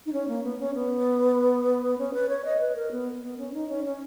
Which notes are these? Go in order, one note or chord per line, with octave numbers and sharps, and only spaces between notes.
D#4
C#4
A#3
B3
C#4
B3
C#4
B4
C#5
D#5
B4
A#4
B3
B3
C#4
D#4
C#4
C#4